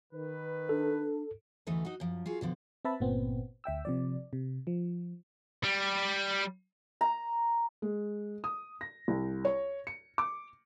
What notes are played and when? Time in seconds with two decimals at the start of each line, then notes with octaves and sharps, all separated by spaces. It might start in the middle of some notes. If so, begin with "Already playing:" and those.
0.13 D#3 B4
0.69 D4 A4
1.67 D2 E3 A3 D#4 B4
1.85 D#4 F#4
2.00 F#2 F3
2.26 F4 F#4 G#4
2.41 B2 D3 F3
2.85 C4 B4 E5 A5 B5
3.00 G1 A#2 B3 C4
3.64 D2 E5 G5 E6
3.85 C3 F3 D5
4.33 C3
4.67 F3
5.64 G3
7.01 A#5
7.82 G#3
8.44 D#6
8.81 A#6
9.08 C2
9.45 C#5
9.87 C#7
10.18 D6